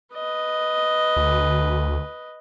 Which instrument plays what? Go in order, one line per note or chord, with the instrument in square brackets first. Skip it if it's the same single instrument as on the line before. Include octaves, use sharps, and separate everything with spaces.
[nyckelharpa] B4 D#5
[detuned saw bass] D2